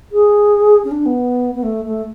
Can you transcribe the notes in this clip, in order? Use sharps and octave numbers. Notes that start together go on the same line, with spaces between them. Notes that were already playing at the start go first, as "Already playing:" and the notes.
G#4
C#4
D4
B3
B3
A3
A3